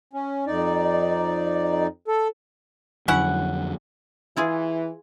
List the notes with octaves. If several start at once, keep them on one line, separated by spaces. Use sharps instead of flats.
C#4
F2 D#4 D5
A4
F2 D3 F#3 C#4 E4 F#5
E3 E4 F4 G#4